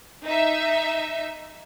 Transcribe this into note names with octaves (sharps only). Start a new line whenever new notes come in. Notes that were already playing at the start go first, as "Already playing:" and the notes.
D#4 E5